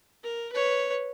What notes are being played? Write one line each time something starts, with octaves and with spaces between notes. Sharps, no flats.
A#4
B4 C#5